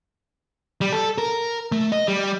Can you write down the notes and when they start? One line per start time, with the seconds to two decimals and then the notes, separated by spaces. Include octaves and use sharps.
0.81 G3
0.93 A4
1.18 A#4
1.72 A3
1.92 D#5
2.08 G3